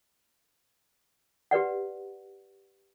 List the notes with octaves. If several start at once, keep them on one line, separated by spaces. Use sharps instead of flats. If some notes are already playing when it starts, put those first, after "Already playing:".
G4 B4 D5 F#5